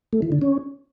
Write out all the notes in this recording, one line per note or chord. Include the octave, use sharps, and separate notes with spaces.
A3
E3
D3
C#4